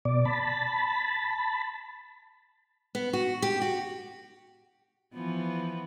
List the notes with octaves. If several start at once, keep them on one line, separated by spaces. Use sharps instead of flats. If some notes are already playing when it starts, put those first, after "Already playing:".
B2 D5
A5 B5
B3
F#4
G4
F#4
E3 F3 B3